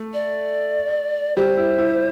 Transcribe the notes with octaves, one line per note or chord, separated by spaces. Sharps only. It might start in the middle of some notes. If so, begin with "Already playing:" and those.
Already playing: A3
D5
G3 G4 C5
E4
E4